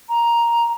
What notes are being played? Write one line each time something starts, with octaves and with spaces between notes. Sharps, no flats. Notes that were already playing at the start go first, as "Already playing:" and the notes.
A#5